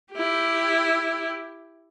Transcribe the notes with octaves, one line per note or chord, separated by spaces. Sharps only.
E4 G4